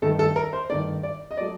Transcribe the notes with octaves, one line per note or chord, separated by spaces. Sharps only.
G2 D#3 A3 A4
A4
A#4
C5
G2 D#3 A3 D5
D5
D#5
F#3 A3 D5